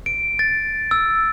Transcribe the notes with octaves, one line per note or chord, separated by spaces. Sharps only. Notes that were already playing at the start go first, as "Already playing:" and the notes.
D7
A6
E6